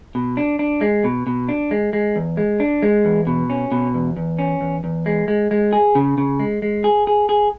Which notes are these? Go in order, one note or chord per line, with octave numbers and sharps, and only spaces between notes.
B2
D4
D4
G#3
B2
B2
D4
G#3
G#3
E2
G#3
D4
G#3
E2
B2
C#4
B2
E2
E2
C#4
E2
E2
G#3
G#3
G#3
G#4
C#3
C#3
G#3
G#3
G#4
G#4
G#4